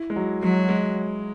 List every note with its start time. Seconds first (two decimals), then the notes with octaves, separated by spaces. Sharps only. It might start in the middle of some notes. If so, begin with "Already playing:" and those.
Already playing: E4
0.10 G#3
0.16 F#3
0.43 F#3 G#3
0.69 G#3